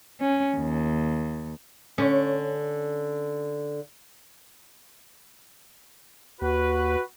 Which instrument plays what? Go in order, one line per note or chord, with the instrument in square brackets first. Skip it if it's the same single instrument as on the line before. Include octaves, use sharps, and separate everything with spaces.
[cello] C#4
D#2
[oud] D3 C#4
[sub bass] D#2 [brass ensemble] F#4 B4